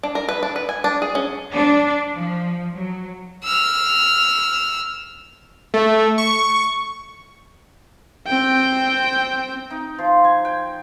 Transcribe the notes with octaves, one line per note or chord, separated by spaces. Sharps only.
D4
A#4
B4
D4
B4
G#5
D4
G#4
C#4
D4
F3
F#3
E6 F6
A3
C#6
C4 G5
D#4
F3
G#5
G5